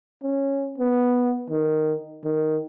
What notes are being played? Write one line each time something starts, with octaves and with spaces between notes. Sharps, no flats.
C#4
B3
D#3
D#3